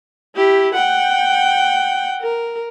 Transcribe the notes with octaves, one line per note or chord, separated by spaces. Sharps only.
E4 G4
F#5 G5
A#4